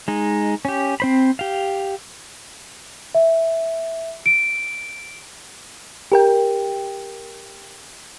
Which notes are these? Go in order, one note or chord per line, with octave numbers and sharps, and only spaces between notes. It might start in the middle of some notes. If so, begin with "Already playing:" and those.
G#3 D#4
C#4 G4
C4 C5 B5
G4 F5
E5
D7
G4 A#4 G5